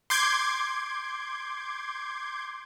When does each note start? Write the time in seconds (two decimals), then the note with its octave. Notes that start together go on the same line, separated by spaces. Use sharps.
0.10 C6 D6 G6 G#6